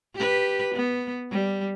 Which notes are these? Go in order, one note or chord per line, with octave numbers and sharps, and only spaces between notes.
G4 B4
B3
G3